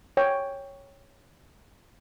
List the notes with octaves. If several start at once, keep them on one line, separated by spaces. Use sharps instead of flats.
C#5 G5